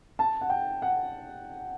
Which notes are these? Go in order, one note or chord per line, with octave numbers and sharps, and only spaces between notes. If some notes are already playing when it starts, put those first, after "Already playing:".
A5
F#5
G5
F#5